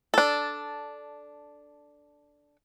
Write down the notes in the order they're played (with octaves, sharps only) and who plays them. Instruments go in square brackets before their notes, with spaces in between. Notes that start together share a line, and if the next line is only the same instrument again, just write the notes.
[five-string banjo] D4 A4